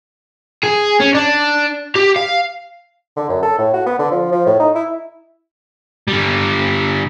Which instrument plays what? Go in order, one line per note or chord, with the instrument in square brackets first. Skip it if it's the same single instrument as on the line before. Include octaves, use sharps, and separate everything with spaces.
[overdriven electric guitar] G#4
C#4
D4
G4
F5
[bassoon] D3
F#2
A4
A2
F#4
B3
D3
F3
F3
A2
D#4
E4
[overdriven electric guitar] D3 G3